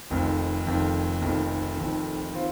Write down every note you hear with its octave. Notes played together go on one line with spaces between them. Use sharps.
F1 F2 D#3
F1 F2 D#3
F1 F2 D#3
F1 F2 D#3
D#3 C4 F4